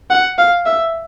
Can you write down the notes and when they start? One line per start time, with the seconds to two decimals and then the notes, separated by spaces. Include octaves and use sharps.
0.10 F#5
0.38 F5
0.66 E5